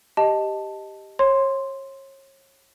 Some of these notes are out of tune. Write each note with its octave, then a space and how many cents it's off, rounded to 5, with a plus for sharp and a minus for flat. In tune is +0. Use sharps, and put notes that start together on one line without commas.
G4 +0 D#5 +0 A5 +0
C#5 -35 C6 +0